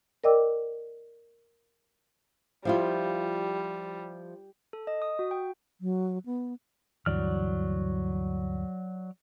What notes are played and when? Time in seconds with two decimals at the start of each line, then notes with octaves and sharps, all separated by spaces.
0.24 A#4 D5 D#5 G5 D6 E6
2.65 F3 G3 E4 F4
4.73 A4
4.87 D#5
5.02 D#6
5.19 F#4
5.31 G5
5.81 F#3
6.26 B3
7.06 D2 G2 E3 F#3 D5 F6